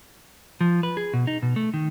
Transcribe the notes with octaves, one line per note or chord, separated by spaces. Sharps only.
F3
B4
G#4
B2
D#4
B2
A3
D#3